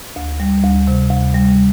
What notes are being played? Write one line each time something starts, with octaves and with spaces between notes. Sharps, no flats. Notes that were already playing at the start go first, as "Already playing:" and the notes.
D2
G3
D2
C3
D2
G3